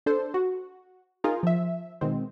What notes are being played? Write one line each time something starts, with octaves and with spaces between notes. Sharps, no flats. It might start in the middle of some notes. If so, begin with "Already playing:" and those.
D4 A4 C5
F#4
D#4 F4 G#4 A#4
F3 E5
B2 D#3 G#3 C4